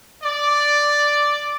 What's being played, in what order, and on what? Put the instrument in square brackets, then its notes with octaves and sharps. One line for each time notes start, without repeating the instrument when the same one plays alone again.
[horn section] D5